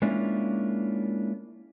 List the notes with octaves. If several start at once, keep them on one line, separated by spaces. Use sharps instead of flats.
G#3 A#3 C#4 D4 E4 F4